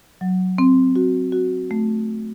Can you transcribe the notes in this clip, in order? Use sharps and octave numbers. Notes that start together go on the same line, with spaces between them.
F#3
C4
F#4
F#4
A3